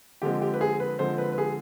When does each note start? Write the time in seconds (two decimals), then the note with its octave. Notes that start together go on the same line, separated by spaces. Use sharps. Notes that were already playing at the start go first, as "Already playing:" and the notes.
0.22 D3 F3 G#3 C4 G4
0.42 G4
0.54 B4
0.61 G#4
0.80 B4
0.99 D3 F3 G#3 C4 C5
1.18 B4
1.32 B4
1.38 G#4